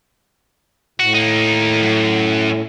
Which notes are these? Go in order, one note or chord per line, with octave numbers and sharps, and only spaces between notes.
A2 F#4
A#3 D#4
F#2